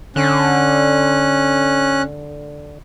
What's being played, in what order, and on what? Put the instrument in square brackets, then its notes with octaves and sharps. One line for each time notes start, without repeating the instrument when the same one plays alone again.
[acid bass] D3 [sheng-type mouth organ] C#4 F#6